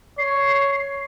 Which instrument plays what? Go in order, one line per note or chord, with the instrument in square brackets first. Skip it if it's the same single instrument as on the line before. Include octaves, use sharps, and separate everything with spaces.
[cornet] C#5 [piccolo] C7